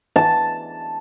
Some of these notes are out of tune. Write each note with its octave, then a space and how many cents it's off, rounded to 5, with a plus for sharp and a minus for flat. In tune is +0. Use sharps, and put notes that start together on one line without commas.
A5 +0